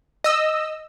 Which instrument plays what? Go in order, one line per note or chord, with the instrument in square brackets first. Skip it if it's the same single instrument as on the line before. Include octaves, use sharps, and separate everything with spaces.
[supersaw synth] D#5 E6